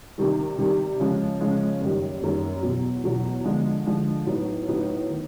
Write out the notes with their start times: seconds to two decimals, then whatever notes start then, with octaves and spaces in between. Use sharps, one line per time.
0.18 C3 D#3 G3
0.58 C3 D#3 G3
1.00 C#3 F3 G#3
1.41 C#3 F3 G#3
1.81 F#1 F#2 D#3 G3
2.22 F#1 F#2 D#3 G3
2.63 E2 B2 F#3
3.04 E2 B2 F#3
3.44 D3 F3 G#3
3.86 D3 F3 G#3
4.26 A2 F#3 B3 D#4
4.68 A2 F#3 B3 D#4
5.09 D#3